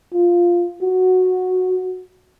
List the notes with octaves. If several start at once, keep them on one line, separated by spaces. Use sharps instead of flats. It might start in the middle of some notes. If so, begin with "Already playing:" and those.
F4
F#4